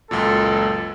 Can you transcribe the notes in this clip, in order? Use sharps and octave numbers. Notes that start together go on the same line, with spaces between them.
C#2 F#2 A#2 A4